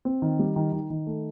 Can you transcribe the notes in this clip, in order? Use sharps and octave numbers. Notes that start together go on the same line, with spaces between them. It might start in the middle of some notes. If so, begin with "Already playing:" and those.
C4
D#3
G3
D#3
D#3
D#3
A3